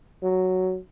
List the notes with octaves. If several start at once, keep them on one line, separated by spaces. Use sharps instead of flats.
F#3